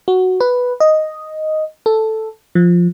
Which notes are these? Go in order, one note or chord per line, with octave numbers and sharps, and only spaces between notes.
F#4
B4
D#5
A4
F3